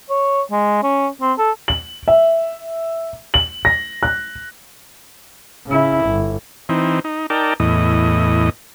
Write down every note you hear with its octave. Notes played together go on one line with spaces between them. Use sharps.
C#5
G#3
C#4
C4
A4
F#7
E5
F#7
A#6
F#6
C#3 E4
G1
E3 C4 D#4
D#4
D#4 A#4 D5 G5 A5
E2 A2 D#5